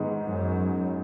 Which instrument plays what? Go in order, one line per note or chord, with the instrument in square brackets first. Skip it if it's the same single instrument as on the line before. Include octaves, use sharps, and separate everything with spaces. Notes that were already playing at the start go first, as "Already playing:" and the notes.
Already playing: [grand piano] G#2 D#3 G#3 B3
[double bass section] F#2